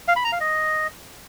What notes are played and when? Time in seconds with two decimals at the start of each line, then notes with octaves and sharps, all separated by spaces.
0.08 F5
0.16 B5
0.24 A#5
0.32 F5
0.40 D#5